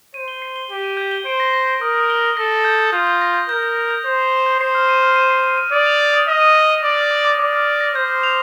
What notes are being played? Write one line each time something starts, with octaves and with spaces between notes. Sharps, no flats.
C5 D#7
G7
C7
G7
G4 G7
D#7
G6
G7
C5 D7
A#6
A#6
A#6
A#4 D#6
D#6
G7
D#6
A4 A#6
A#6
G6
G6
F4 G6
G6
A#6
G6
A#4 G6
G6
F7
G6
C5 G6
F7
G6
G6
C5 C7
F6
D#7
F6
D#7
C7
D#7
D#7
D5 D#6
F7
F7
D#6
D#5 D#6
D#6
A#6
D#6
D5 D6
F6
D6
D6
D5 D6
F6
D6
A#6
C5 G6
G6
F7